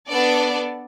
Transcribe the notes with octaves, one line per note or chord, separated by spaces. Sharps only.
B3 D4 A4 D5